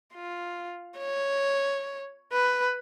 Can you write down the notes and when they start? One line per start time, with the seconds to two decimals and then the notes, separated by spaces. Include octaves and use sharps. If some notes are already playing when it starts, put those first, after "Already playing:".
0.15 F4
0.99 C#5
2.32 B4